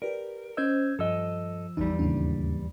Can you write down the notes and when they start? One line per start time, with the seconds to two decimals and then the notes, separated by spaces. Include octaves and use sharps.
0.02 G4 A#4 B4 D5
0.57 C#4 C5 D#5 E6 G6 G#6
0.99 G2 F3 A4 D#5 E6
1.77 A1 E2 G3 D#4
1.99 D#2 G#2 C#3 E3 D4